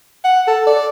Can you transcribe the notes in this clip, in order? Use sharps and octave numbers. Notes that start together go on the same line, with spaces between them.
F#5
A4
D5